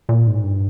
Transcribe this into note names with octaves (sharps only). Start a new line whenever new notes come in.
A#2
G#2
G2